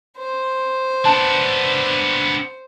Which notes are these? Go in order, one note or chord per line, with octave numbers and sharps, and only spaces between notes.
C5
B3 D4 A5